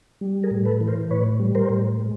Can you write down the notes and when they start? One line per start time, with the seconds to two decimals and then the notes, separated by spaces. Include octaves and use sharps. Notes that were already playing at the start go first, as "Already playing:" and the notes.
0.21 G3
0.43 G#4 A#4
0.51 A2
0.65 A4 B4
0.81 E3
0.88 A#4 C5
1.10 A2 B4 C#5
1.40 G3
1.55 A#4 C5
1.70 A2
2.00 G#3